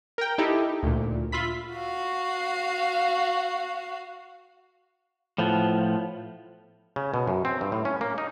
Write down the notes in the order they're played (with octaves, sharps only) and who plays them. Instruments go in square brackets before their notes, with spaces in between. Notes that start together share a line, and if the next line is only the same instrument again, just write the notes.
[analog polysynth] A#4 G5
D#4 E4 G4 A4 D#5
D2 A#2
F4 E5 B5 B6
[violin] F#4 F5
[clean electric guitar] A2 F3 B3
[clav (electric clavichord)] C#3
B2
F#2
C4
G2
A2
C#4
A#3
D#4